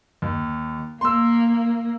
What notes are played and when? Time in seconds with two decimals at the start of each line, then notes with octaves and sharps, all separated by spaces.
0.22 D#2
1.01 A#3 C6 E6